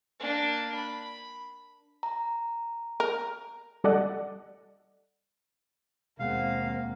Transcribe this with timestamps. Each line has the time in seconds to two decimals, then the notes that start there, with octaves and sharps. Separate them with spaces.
0.20 A#3 D4
0.75 B5
2.03 A#5
3.00 A#4
3.84 G3 A4 D5 D#5 F#5
6.19 D#2 B2 G#3 A#3 C4 F5 F#5